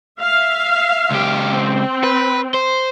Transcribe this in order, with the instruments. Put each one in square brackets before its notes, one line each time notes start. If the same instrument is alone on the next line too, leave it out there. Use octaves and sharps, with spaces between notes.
[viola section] E5 F5
[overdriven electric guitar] C#2 G4
[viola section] C4
[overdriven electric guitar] B4
C5